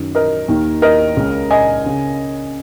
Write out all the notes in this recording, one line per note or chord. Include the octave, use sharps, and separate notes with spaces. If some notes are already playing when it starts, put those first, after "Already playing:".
Already playing: F#2 D#3
A#4 D#5
D#2 D#3
A#4 D#5
C#2 C#3
D#5 G#5
C#3